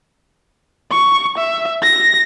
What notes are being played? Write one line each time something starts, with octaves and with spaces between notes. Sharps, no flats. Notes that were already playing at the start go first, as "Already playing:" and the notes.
C#6
E5
A#6